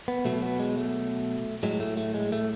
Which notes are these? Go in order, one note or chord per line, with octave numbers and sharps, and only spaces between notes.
B3
B2 F#3 A3
B3
G#3
A3
A2 F#3 G#3
A3
A3
G#3
A3